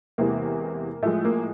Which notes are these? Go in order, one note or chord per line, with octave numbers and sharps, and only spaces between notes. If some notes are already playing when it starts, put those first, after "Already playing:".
E2 C3 E3 G#3 A#3
A2 F3 G#3 A3
A#3